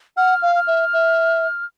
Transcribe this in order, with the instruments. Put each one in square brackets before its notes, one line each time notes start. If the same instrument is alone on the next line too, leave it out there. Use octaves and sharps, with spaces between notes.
[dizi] F#5 [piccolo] F6
[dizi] F5
[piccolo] F6
[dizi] E5
E5